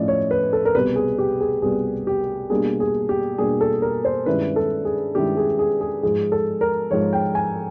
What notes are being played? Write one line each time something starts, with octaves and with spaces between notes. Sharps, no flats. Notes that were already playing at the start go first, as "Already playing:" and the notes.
Already playing: A2 F3 A3 C#4 E4 D5 D#5
C#5
B4
A4
A#4
C2 B2 G3 B3 B4
G#4
G4
G#4
C2 B2 G3 B3 G#4
G4
B2 G3 A#3 D4 G#4
G#4
G4
B2 G3 A#3 D4 G#4
A4
A#4
C5
G2 D#3 G#3 C#4 E4 B4
A4
G#4
G2 D#3 G#3 C#4 E4 G4
G#4
G#4
G#4
G#2 F3 G#3 G#4
A4
A#4
G#2 F3 G#3 C#5
G5
G#5